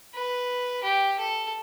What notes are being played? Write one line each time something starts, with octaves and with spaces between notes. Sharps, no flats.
B4
G4
A4